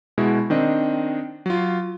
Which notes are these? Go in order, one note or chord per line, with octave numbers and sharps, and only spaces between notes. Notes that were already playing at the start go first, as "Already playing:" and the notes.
B2 G#3 E4 F#4
D#3 C4 D4 D#5
F#3 F4